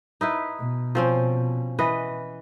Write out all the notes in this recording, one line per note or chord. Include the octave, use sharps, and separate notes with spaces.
D#4 E4 B4
B2
F3 C4 C#4
E3 B4 D#5